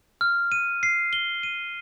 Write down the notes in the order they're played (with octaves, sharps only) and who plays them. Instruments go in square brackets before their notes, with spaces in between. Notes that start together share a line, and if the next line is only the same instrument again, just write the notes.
[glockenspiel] F6
D#7
C7
G7
D#7